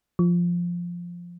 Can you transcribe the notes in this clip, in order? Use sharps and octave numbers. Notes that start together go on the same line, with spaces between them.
F3